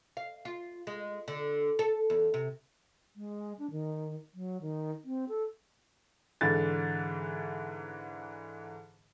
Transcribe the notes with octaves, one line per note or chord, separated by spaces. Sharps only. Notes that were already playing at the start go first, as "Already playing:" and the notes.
F5
F4
G#3
D3
A4
E2
C3
G#3
D4
D#3
F#3
D#3
C4
A4
G#2 D3 E3 A6